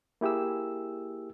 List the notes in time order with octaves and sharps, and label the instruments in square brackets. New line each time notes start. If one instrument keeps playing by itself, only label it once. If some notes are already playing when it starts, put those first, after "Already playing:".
[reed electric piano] A#3 E4 G4 G#4 E6